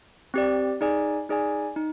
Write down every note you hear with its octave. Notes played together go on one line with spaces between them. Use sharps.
C4 G4 D5
D#4 G#4 D5 G#5
D#4 G#4 D5 G#5
D#4